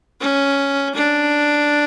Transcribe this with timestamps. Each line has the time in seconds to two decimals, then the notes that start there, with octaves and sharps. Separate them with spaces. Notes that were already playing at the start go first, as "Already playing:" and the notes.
0.21 C#4
0.96 D4